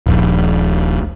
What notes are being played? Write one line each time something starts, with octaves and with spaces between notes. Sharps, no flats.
D#1 A#1